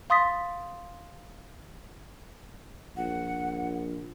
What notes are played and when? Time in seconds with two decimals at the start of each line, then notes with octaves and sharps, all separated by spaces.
0.10 F5 C6 D#6 A6 B6
2.97 A#1 F#5